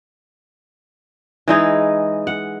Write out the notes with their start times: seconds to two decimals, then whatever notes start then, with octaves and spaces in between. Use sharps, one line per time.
1.48 E3 G#3 D#4
2.27 F#5